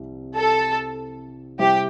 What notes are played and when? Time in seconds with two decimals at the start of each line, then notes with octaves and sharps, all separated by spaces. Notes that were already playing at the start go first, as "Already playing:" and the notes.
Already playing: C2 C3
0.36 A4
1.59 C3 G3 C4 E4 G4